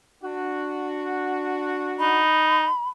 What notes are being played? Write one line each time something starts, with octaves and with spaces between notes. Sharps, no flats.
D4 F#4
D#4 B5